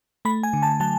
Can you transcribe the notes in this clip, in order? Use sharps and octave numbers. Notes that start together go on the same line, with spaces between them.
A3 B5
G#5
D3
A5
F#3 A5